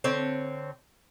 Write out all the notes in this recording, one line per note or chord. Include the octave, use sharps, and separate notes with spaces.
D3 C4 C#5